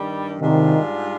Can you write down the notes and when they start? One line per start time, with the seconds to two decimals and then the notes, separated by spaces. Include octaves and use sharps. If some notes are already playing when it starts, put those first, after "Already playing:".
Already playing: G2 D#3 G3
0.40 G#2 C3 D#3 G3 D4 F4